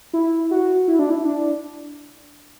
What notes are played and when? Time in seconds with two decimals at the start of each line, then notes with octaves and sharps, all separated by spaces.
0.13 E4
0.51 F#4
0.88 E4
0.99 D4
1.10 E4
1.25 D4